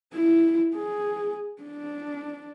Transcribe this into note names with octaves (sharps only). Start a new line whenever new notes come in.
E4
G#4
D4